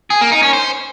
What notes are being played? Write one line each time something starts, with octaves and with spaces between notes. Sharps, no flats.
G#4
A#3
D#4
C#4
C5